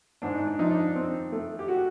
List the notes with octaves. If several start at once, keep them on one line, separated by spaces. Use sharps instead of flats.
G#2 D4
D#4
D4
F3 D#4
D4
C4
A3
G4
F#4